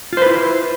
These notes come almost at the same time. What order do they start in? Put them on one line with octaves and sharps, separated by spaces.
F4 C5 B4 E4